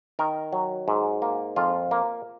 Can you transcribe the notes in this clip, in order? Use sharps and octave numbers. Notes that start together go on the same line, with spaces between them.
D#3 A#4
F#3
G#2
A#3
F2 F4
A#3